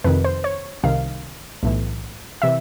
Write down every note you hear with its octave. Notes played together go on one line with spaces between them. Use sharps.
F2 C3 D#3 B4
C5
C#5
C2 C3 D#3 F5
B1 A2 E3
C3 E3 E5